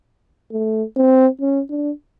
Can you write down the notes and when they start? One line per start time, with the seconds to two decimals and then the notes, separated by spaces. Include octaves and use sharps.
0.52 A3
0.96 C4
1.41 C#4
1.70 D4